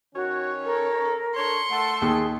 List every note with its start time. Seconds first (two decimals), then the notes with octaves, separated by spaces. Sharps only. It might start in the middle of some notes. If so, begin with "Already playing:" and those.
0.15 D#3 C#4 F#4 C#5
0.65 A4 A#4
1.36 D4 A4 C#5 C6 C#7
1.70 A3 A4 F#5
2.01 D#2 G#4